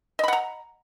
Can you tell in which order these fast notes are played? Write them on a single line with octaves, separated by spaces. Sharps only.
D#5 B5 F#5 A#5